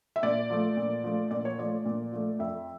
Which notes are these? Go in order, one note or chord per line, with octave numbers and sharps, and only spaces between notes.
E5
A#2 D5
F3 A3
A#2
F3 A3
A#2 D5
C#5
F3 A3 D5
A#2
F3 A3
F2 E5